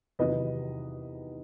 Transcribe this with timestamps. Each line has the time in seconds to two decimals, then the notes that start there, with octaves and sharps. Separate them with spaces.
0.19 E2 C3 D#3 F#3 B4 D#5